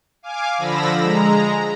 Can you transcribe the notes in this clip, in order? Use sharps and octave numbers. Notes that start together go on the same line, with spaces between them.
F5 G#5 D6
D3 F3 B5 E6 A#6
G#3 A#5